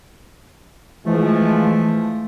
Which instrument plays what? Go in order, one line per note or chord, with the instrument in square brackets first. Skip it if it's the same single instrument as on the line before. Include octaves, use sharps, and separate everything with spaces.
[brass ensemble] E3 F3 G#3 [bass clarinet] A3